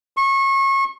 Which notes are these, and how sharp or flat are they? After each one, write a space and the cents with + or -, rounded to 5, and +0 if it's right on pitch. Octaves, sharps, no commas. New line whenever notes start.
C#6 -30